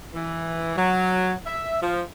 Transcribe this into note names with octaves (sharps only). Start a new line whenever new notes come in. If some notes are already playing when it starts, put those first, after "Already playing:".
E3
F#3
E5
F3